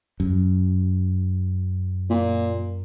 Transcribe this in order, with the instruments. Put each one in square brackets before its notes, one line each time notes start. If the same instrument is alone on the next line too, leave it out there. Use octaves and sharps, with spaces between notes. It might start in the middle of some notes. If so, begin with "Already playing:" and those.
[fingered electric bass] F#2
[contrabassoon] A#2